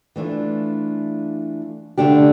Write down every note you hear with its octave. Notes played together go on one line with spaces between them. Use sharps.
E3 A3 D4 F4
D3 A3 D4 G4